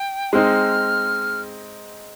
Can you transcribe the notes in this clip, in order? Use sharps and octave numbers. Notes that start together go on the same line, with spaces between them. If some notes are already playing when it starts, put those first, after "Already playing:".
Already playing: G5
G#3 C4 D#4 F6